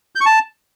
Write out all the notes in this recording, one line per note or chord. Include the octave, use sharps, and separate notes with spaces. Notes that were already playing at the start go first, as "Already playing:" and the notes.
G6
C#6
A5